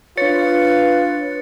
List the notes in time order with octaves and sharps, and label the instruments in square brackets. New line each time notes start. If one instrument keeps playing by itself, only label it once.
[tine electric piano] D4 C#5 [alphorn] F4 [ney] B4 [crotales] A6 C#7